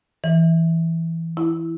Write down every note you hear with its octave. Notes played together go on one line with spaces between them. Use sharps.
E3
E4